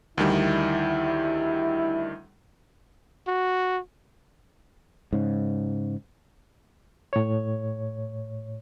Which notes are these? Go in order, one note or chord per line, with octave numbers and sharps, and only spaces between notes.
D2 D#3 G3 E4
F#4
G#2 C#3
A2 C#5